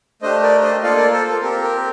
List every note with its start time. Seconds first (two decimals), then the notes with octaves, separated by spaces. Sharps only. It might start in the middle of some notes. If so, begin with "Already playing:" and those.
0.22 A3 D4 G4 C5 D#5
0.42 A#4 D5
0.62 C5 D#5
0.82 A#3 F4 A4 D5 F5
0.97 A#4 D5
1.12 A4 C5
1.27 A4
1.41 C4 G4 A#4
1.62 A#4